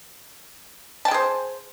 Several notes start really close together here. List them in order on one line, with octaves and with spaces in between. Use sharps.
A5 G5 G#4 C5